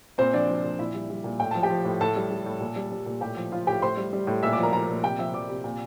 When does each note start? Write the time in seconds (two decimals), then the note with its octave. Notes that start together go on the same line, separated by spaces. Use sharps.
0.18 A#2 C4 C5
0.33 F3 D4 D5
0.49 F3
0.64 A#2
0.79 A#2 E4 E5
0.95 G3
1.10 G3
1.24 A#2
1.40 A2 G5
1.51 F3 A5
1.63 G4 G5
1.70 F3
1.85 A2
2.01 A2 A4 A5
2.16 G3
2.31 G3
2.46 A2
2.60 A#2
2.76 G3
2.92 G3
3.06 A#2
3.21 A2 G4 G5
3.37 F3
3.52 F3 F4 F5
3.67 A2 G4 G5
3.82 A2 C5 C6
3.97 G3
4.13 G3
4.27 A2
4.43 A#2 E5 E6
4.53 D5 D6
4.58 F3 A#4 A#5
4.73 F3 A#4 A#5
4.88 A#2
5.03 C3 G4 G5
5.19 F3 E5 E6
5.33 F3 D5 D6
5.49 C3
5.64 A#2